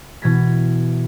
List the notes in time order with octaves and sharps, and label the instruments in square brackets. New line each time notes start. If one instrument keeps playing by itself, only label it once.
[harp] B2 E3 G#6 A#6 B6